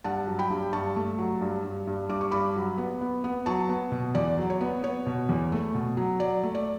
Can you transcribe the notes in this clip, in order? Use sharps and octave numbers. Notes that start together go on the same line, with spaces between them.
G2 F#5 A5
F#3
G5 B5
G2
G2 A5 C#6
A3
F#3
G2
G2
G2
G2 D6
C#6
G2 B5 D6
F#3
B3
B3
B3
F#3 A5 C#6
B3
B2
E2 D5
F#3
C#5
B3
B3 C#5
B2
E2
A3
B2
F#3
F#3 D5
A3
D5